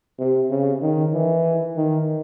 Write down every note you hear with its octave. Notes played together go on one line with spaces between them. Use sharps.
C3
C#3
D#3
E3
D#3